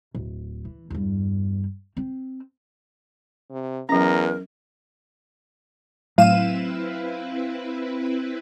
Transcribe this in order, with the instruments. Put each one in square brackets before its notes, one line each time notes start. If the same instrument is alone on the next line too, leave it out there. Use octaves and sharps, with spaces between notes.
[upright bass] D1
E3
E2 G2
C4
[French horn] C3
[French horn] E2 [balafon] F#3 C#4 [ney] A#4 [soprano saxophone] A#5
[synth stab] A2 D#7 E7 [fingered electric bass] F#3 [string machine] C4 E4 B4 [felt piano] F5